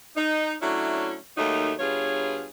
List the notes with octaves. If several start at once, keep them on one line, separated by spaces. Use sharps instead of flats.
D#4
F#3 A3 C#4 D4 E4
D#2 F#3 A3 A#3 D#4
G2 B3 F4 G#4 C#5